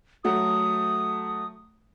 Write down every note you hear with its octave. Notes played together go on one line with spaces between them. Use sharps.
F#3 A3 F#5 D#6